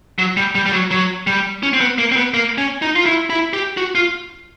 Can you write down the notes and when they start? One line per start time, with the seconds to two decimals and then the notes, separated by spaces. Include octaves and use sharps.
0.19 F#3
0.37 G3
0.55 G3
0.66 G3
0.73 F#3
0.91 F#3
1.27 G3
1.63 C#4
1.73 C4
1.81 B3
1.98 A#3
2.12 C4
2.16 B3
2.34 A#3
2.58 C#4
2.82 D#4
2.95 F4
3.06 E4
3.30 E4
3.53 G4
3.77 F#4
3.95 F4